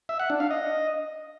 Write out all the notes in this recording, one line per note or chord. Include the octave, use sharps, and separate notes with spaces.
E5
F#5
D4
F5
D#5